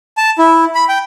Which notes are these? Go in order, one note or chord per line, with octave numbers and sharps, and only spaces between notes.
A5
E4
B5
G5